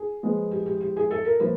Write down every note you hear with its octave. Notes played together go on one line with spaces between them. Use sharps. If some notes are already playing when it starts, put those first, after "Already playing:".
Already playing: G#4
F3 G#3 B3
G4
G4
G4
G#4
A4
A#4
F3 A#3 B4